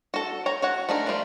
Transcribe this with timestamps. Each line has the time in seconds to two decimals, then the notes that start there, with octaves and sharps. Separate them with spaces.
0.14 F#4 A4
0.46 C#5 G5 A#5
0.62 F#4 C#5 F#5
0.89 A3 D4 D#4 G#4 A#4
1.06 F3 G3 A3 F4 G4